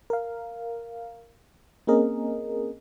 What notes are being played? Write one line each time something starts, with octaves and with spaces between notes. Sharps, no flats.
A#4 F5
A#3 C4 C#4 G#4 A#4 D#5